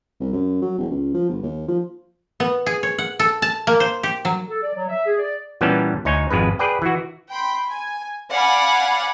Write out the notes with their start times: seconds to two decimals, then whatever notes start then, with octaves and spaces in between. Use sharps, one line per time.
0.20 C2
0.33 F#2
0.62 F#3
0.78 E1
0.90 C#2
1.14 F3
1.29 G1
1.43 D#2
1.68 F3
2.40 B3
2.66 G#4
2.83 C#5
2.98 F#5
3.19 A4
3.42 A5
3.67 A#3
3.80 C5
4.03 G4
4.25 F#3
4.49 A4
4.62 D5
4.75 F#3
4.88 E5
5.05 G#4
5.19 D5
5.61 A#2 E3 G3 B3 C#4 A5
6.05 D2 D#4 C#5 G#5
6.31 G#1 F2 G#3 B4
6.59 G#4 B4 D5 G5
6.82 E3 F#4
7.31 G5 B5 C6
7.69 G#5
8.31 D5 F5 F#5 G#5 B5 D6